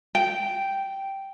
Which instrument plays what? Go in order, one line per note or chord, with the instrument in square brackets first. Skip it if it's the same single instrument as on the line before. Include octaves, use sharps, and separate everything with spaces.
[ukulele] G5